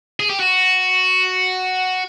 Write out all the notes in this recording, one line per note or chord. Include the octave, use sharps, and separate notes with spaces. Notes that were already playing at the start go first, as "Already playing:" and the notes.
G#4
G4
F#4